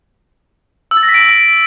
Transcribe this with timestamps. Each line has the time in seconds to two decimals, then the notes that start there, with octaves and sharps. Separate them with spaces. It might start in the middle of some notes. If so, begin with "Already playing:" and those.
0.91 E6
0.97 A6
1.03 A#6
1.09 B6
1.14 D7